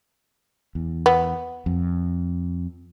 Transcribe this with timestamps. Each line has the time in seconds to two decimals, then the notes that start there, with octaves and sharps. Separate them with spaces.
0.75 E2
1.06 B3
1.66 F2